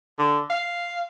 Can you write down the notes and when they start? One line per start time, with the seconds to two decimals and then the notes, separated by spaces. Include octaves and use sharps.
0.19 D3
0.50 F5